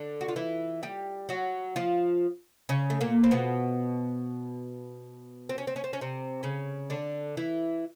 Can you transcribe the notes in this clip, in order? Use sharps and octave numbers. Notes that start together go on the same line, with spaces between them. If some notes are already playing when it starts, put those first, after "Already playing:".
Already playing: D3 D4
F#4
F4
E3 E4
G3 G4
F#3 F#4
F3 F4
C#3 C#4
A3
A#2 A#3
C4
B2 B3
C4
C#4
C4
C#4
C4
C#4
C3 C4
C#3 C#4
D3 D4
E3 E4